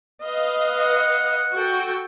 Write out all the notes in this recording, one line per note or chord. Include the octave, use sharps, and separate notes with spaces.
B4 D#5 F5
F#5
F#4 A4 G5